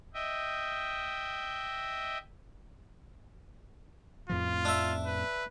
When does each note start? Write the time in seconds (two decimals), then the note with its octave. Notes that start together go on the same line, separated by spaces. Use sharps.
0.14 D#5 E5 G5
4.29 F2 A2 F3 F4
4.65 D4 E5
5.06 B4